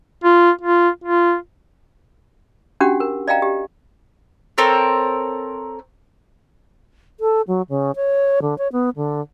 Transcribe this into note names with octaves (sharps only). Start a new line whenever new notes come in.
F4
F4
F4
C#4 D4 F#4 G4 F#5
A#4
D5 D#5 F5 G5 A#5
G4
C4 A4 A#4 C#5
A4
F#3
C#3
C#5
D3
C#5
B3
D3